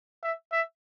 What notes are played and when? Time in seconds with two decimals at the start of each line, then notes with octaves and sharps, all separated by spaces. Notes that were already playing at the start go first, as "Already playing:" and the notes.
0.23 E5
0.52 E5